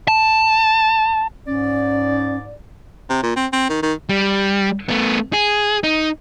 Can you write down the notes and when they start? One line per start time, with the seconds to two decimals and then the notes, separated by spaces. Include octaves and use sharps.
0.08 A5
1.47 G#2 C#4 D5
3.09 C3
3.23 A#2
3.36 C4
3.53 C4
3.69 D#3
3.82 D#3
4.09 G3
4.89 A3 B3
5.33 G#4
5.83 D#4